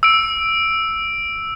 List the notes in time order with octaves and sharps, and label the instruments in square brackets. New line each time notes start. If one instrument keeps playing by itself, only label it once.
[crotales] E6 D7